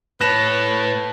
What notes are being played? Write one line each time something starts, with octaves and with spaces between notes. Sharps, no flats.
A2 B4 C#5 A5 F#6 A#6 E7